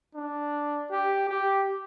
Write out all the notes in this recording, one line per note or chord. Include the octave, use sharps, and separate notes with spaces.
D4
G4
G4